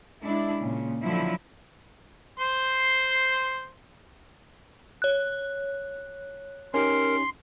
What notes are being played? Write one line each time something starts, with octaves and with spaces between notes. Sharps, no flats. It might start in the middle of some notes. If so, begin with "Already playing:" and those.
G#3 D4 E4
A#2 C#3
D3 F3 F#3 E4
C5 C6
C#5 F#6
C#4 D#4 G4 A#4 C6